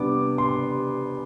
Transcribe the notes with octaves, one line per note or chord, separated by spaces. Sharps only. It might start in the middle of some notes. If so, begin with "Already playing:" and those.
Already playing: C3 G3 B3 D4 D6
C6